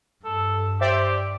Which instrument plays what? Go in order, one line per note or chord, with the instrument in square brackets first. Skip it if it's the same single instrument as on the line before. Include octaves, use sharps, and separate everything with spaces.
[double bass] G2 [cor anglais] A4
[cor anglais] G4 [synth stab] C5 D5 E5